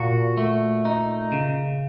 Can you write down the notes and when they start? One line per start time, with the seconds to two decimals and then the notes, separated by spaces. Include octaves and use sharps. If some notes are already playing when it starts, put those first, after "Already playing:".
Already playing: A#2 F#4
0.37 A3
0.85 D#4
1.32 C#3